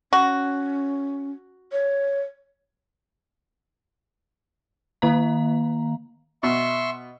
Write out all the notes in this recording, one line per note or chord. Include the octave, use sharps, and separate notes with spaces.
C#4 F#4
C#5
D#3 A#3 F5 A#5
B2 E5 C6 C#6